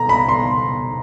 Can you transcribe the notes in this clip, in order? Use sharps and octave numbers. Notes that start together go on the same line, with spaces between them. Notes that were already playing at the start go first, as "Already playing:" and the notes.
Already playing: B2 A#5
B5
C6